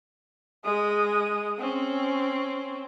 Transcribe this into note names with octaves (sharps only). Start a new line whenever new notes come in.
G#3 D#6
C4 C#4